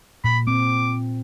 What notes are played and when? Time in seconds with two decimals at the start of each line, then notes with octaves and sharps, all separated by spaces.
0.24 A#2 B5
0.47 C4 D6